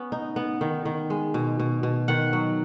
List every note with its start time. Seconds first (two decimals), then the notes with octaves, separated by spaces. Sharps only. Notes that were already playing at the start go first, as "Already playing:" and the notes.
Already playing: B3 C#4
0.12 D#4
0.36 B3
0.61 D#3
0.85 D#3
1.10 G#3
1.34 B2
1.59 B2
1.83 B2
2.08 D#3 F#5
2.33 F#3